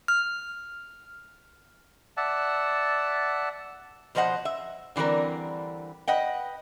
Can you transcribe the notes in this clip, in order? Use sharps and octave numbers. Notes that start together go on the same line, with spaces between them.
F6
D5 E5 F#5 A5
B2 F3 C5 D#5 F#5
E5
D3 E3 G3 C4 A#4
B4 D#5 F#5 G5